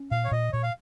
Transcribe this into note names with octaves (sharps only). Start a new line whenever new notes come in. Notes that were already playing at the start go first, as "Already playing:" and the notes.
Already playing: C#4
A#2 F5
C#5
A#2 D#5
A#2 C#5
F5